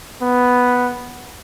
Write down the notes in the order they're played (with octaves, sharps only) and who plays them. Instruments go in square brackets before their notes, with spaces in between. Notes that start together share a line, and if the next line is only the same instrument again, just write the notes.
[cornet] B3